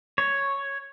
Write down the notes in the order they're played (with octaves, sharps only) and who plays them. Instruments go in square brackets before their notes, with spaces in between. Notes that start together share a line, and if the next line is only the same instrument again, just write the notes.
[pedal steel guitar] C#5